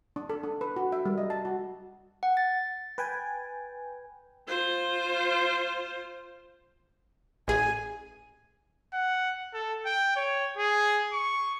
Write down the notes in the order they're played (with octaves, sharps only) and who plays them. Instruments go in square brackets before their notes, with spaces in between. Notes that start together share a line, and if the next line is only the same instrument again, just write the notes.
[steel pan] D4
A4
D4
B4
F#4
E5
G3
D#5
A5
F#4
[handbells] F#5
A6
[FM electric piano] B4 G5 G#5
[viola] F4 C5
[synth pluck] A1 G#4 [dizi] G#5
[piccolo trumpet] F#5
A4
G5
C#5
G#4
C#6